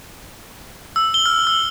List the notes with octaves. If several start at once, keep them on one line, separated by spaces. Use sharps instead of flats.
E6
G7
F6
E6